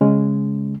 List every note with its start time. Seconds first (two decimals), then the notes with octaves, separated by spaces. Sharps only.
0.01 C#3 G#3 C#4